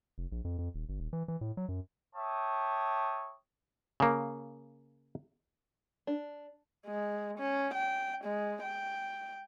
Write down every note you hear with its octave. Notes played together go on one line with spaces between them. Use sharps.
F1
A#1
F2
F2
D#1
G1
D#1
E3
E3
A2
F#3
F#2
C#5 E5 G5 A5 D6 D#6
C#3 A#3
D4
G#3
C#4
G5
G#3
G5